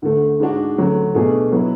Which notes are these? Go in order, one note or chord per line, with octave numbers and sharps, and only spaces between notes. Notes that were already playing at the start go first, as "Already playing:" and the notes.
D2 D3 A3
G#2 G#3 D4 F#4
D2 C#3 F#3 A3
B2 A3 D4 G#4
F#3 B3 E4